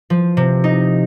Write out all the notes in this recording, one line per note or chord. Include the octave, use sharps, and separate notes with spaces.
F3
C3
D#4